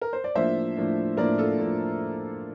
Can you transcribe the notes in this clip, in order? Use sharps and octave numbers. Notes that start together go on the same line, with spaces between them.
A#4
C5
D5
A2 F3 A#3 D4 C5 E5
A2 F3 A#3 D4
A2 F3 A#3 D4 A#4 D5
F4 A4
A2 F3 A#3 D4